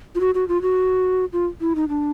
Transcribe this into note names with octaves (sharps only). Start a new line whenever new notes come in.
F4
F#4
F#4
F4
F#4
F4
E4
D#4
D4